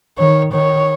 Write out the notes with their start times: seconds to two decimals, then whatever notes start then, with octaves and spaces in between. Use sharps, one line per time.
0.18 D#3 C#5
0.53 D#3 C#5